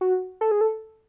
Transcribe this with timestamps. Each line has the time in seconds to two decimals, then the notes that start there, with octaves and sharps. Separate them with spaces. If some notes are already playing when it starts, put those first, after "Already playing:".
0.01 F#4
0.41 A4
0.51 G#4
0.61 A4